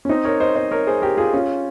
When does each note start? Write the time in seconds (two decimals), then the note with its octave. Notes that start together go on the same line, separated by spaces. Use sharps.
0.05 C#4
0.09 C4 D#4
0.24 A#4 C#5
0.40 C5 D#5
0.56 C5 D#5
0.71 A#4 C#5
0.87 G#4 C5
1.02 G4 A#4
1.17 F4 G#4
1.33 C#4 F4